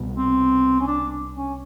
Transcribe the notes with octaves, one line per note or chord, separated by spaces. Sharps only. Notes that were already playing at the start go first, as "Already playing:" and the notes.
Already playing: C2 B2 G3 B3
C4
C#4
D4
C#4